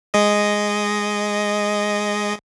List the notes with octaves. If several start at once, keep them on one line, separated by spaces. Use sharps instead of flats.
G#3 D#5